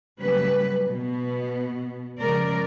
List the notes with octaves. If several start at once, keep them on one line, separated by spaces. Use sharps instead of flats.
C#3 F#3 G3 A3 A#3 B4
B2 B3
C#3 F3 G#3 A#4 D5